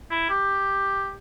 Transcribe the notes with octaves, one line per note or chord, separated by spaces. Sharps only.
E4
G4